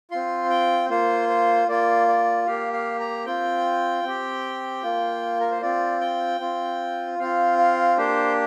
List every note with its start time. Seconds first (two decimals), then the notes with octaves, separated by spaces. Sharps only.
0.11 C4 F4 C6
0.50 G5
0.90 A#3 F4 C5
1.29 C5
1.68 A#3 F4 D5
2.08 D5
2.47 A#3 G4 F5
2.73 F5
3.00 A#5
3.26 C4 F4 G5
4.04 C4 G4
4.83 A#3 F4
5.40 A#4
5.51 C5
5.62 C4 F4 D5
6.01 G5
6.40 C4 F4
7.19 C4 F4 F5
7.59 F5
7.97 A#3 D4 G4 C5